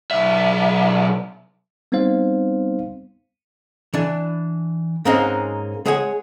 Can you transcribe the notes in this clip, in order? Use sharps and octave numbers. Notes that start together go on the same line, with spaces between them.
B1 E5
G3 B3 C4 D#4 C5 F5
E3 D4
G#2 G#3 A#3 C4 C#4 D#4
G#3 G#4 C#5 F#5 G#5